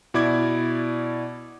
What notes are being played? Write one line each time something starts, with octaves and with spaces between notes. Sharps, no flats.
B2 E4 D5 D6 G#6